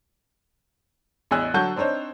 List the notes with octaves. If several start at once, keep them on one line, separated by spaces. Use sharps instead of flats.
A1 E2 D#5 G#5 E6 F#6
D3 F#3 F#5 A5 C#6 G6
C4 D4 D#4 C5 C#5